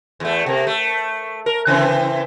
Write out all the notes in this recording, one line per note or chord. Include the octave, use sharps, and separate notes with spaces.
E2 A3
C3 A#3
A3
A#4
C#3 E3 C4